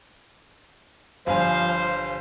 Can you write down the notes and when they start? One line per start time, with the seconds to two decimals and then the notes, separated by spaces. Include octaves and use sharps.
1.27 G1 G2 F3 C5 F5 G#5